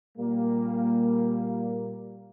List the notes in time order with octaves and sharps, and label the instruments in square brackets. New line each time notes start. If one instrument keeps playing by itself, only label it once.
[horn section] A#2 G3 A#3